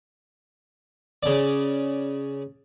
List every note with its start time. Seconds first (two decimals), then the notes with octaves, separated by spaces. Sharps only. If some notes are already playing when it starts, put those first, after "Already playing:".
1.23 C#3 D5